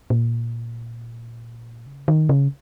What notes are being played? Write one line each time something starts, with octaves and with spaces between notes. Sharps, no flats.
A#2
C#3
D#3
C#3